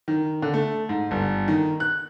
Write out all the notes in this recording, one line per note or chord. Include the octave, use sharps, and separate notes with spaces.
D#3
D3
A3
G#2
G1
D#3
F#6